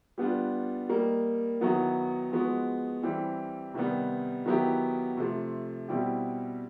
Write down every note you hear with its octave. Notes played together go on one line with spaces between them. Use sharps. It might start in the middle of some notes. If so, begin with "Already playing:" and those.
G3 B3 D4 F4
G3 A#3 D#4
D#3 F#3 B3 E4
F3 G#3 B3 D#4 F#4
E3 G3 C4 E4 G4
C3 D#3 G3 B3
D#3 F#3 B3 E4 G4
C3 F3 A3
B2 G3 C4 E4 G4